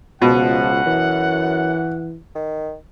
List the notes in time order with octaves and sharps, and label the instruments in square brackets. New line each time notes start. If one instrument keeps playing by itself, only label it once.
[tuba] C#2 [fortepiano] B2 [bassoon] F3 [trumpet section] F#5
[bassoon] F#2 [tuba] E3
[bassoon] D#3